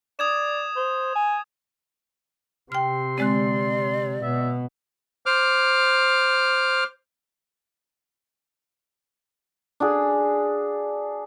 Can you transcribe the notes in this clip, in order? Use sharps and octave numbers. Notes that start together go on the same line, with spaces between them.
D5 D#6 G#6 E7
C5
G#5
C3 G5 C6 F6
D3 G#3 C4 D5
B2 E5
C5 D6 F6
D4 F#4 G#4